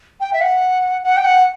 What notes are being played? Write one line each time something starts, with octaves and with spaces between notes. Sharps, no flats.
G5
E5
F#5
F#5
G5
F#5